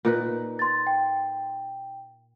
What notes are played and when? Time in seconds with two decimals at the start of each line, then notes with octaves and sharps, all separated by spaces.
0.05 A#2 D#4 B4
0.59 C6 A6
0.87 G5